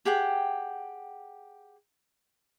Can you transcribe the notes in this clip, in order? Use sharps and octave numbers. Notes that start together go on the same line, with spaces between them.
G4 G#4 F#5 G5